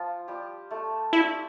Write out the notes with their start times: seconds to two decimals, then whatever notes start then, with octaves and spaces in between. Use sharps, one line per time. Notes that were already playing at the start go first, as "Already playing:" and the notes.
Already playing: F3 F4
0.28 G3 G4
0.71 A3 A4
1.13 G3 E4 G4